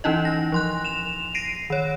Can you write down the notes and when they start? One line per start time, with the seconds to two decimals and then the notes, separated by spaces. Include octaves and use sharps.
0.04 E3 C#4 D#4 E4 D#5
0.25 A#6
0.52 F3 C6 F#6
0.85 E7 F7
1.35 A#6 C7 D7 D#7
1.70 D#3 C#5